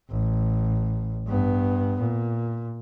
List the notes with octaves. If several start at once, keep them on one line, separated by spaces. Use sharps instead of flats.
A1
G2 B3
A#2